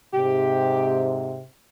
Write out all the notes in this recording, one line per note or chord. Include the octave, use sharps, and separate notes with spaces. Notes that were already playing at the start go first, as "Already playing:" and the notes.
G#2 C3 G4